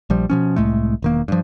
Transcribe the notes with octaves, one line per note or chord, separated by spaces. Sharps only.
A#1 F3 G3
B2 F3 C#4
C2 A2 G#3 A3
E1 D#3 A#3
G2 F3